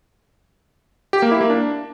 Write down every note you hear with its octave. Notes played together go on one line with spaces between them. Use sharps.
G4
A#3
E4
A#3
D4